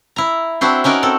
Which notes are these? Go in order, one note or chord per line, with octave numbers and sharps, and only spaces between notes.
E4 A#5
C4 D4 E4 F#4 C5
C#4 D#4 F#4 A#4 D5
C4 A4